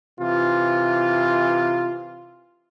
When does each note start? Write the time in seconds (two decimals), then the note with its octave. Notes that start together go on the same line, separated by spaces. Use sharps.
0.20 C3 E3 F4